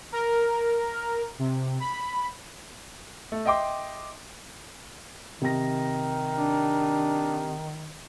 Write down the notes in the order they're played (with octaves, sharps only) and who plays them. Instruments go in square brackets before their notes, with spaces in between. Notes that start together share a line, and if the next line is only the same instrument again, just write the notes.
[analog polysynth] A#4
C3
B5
[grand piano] A3
D#5 E5 G5 C6 D6
[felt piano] C3 A#6 [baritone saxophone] D#3
[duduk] D4